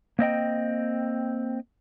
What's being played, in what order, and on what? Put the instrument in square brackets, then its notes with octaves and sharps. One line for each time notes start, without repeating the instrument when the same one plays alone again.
[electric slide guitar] A#3 C4 D#5 G5